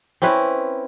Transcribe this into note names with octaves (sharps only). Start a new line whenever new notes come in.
C4 C#4 E4 B4